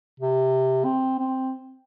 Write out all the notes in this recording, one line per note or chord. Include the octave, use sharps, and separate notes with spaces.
C3
C4
C4